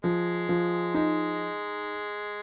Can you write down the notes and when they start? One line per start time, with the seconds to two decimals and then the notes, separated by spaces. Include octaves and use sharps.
0.04 F3 G#3
0.49 F3
0.95 G#3 D#4